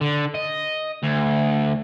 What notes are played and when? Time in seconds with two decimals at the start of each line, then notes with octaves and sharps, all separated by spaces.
0.01 D3
0.34 D#5
1.03 D2